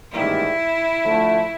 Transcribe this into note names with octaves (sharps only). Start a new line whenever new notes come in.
A1 G#2 D#3 G3 A#3 E4
D3 F3 A3